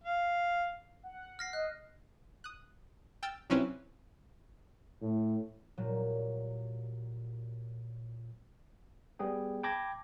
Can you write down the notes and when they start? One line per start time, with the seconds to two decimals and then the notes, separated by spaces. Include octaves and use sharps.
0.03 F5
1.03 F#5
1.39 F6 A#6 C7
1.53 D#5 F#6
2.44 D#6 F#6
3.23 G5 E6 F6 A6
3.50 C2 F#3 C4 C#4 E4 B4
5.02 A2
5.77 A#2 F#3 G3
9.19 G3 B3 G#4 G5
9.63 G5 A5 B5 D6 G#6 A#6